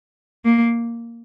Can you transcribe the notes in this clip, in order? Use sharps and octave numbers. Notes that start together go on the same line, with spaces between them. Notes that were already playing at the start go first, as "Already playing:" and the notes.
A#3